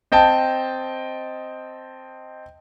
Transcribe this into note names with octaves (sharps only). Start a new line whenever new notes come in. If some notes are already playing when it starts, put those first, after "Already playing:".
C4 D#5 G5 A5